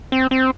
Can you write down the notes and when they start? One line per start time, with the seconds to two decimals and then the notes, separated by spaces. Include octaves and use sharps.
0.12 C4
0.31 C4